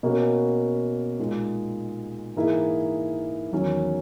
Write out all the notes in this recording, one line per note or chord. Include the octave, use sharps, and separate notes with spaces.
B2 A#3 C#4 F#4 A#4
A#2 G#3 D#4
G#2 E3 A#3 E4 G#4
E2 D#3 F#3 C#4